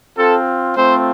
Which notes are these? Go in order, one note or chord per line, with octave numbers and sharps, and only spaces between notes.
C4 F4 A4
A3 C4 F4 C5